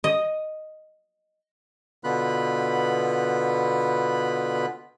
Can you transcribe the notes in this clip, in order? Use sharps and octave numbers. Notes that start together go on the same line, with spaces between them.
D#5
B2 D3 B3 F4 B5 F#6